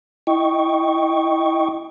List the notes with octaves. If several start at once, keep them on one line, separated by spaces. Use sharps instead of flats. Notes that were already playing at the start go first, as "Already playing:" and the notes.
E4 D#5 G5 C#6